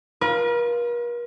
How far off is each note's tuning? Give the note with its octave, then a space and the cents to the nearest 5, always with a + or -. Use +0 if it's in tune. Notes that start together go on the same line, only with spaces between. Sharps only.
F4 +0 A#4 +45